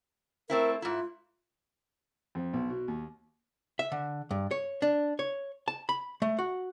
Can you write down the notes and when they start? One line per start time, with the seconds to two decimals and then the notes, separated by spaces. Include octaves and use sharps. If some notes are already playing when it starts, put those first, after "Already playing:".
0.50 A3 C4 E4 A#4
0.82 G#2 E4 F4
2.35 F2
2.53 B1
2.70 B2
2.88 D#2
3.79 E5
3.92 D3
4.31 G2
4.51 C#5
4.82 D4
5.19 C#5
5.68 A5
5.89 B5
6.22 A3
6.39 F#4